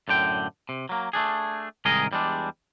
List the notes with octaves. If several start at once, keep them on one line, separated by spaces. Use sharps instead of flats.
F#2 A2 D3 G5
C3
F#3 A#3
A3 D4 G#4
C2 G#2 D#3 G#4 A#4 D#5
E2 G3 G#3 D4